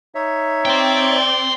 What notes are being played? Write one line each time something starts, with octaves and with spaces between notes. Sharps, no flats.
D#4 C#5 E5
C4 D5 G5 C6